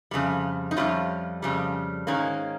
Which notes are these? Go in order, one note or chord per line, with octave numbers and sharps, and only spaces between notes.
F2 C#3 G3
D#4
F2 C#3 G3 C#4 F4
F2 C#3 G3
G#2 D#3 G#3 A#3 C#4